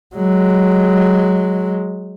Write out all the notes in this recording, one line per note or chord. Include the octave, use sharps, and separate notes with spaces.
F#3 G#3